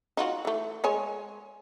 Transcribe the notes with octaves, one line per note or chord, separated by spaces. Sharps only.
D#4 F4 F#4
E3 A3
G#3 C#5 G#5